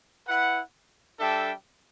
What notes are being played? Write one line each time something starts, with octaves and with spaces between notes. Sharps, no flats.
E4 B4 F#5
G3 D4 A4 E5 G5